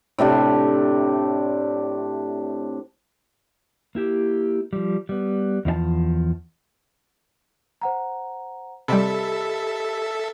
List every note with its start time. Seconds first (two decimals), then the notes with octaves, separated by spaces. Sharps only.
0.18 A2 C3 D4 G4
3.95 A#3 E4 G4
4.73 F3 G3
5.09 G3 B3
5.65 E2 F3 D#4 A5
7.81 C5 F#5 A#5
8.88 C3 G3 G4 A4 D#5 E5 B5